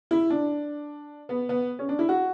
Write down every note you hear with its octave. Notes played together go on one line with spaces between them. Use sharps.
E4
D4
B3
B3
C#4
D4
E4
F#4